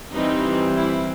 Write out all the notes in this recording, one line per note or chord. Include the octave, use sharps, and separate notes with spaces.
E3 G3 C4 D#4
E4